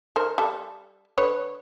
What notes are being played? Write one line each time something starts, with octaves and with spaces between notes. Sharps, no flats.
D#3 A#4 C5
G3 A4
D3 B4 C#5